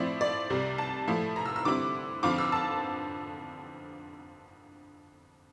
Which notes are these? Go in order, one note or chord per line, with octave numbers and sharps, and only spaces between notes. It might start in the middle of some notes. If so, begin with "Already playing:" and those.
Already playing: A2 F3 C4 E4 D5
D5
C2 C3 G3
A5
A2 F3 A3 E4
A#5
E6
E6
D3 G3 C4 E4 D6
F2 D3 F3 C4 F4 D6
E6
A5